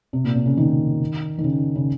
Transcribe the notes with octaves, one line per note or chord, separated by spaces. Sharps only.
C3
A#2
C3
C#3
D#3
D#3
C#3
C#3